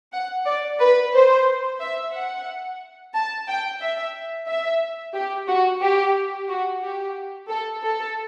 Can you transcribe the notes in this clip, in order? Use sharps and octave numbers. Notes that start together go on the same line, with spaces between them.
F#5
D5
B4
C5
E5
F#5
A5
G5
E5
E5
G4
F#4
G4
F#4
G4
A4
A4